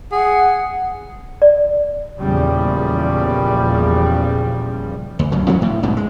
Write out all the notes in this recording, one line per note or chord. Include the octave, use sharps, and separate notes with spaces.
G#4 F#5
D5
E2 A#2 C#3 F3 G3
D2
C#2 F#2 C#3
E3 F3 B3 C#4
A2
B1 G#2 B2
G#3